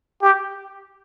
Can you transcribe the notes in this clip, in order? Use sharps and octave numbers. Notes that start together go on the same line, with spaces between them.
G4